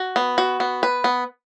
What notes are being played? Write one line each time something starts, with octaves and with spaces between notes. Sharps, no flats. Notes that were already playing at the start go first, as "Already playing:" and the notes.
Already playing: F#4
B3
F#4
B3
B4
B3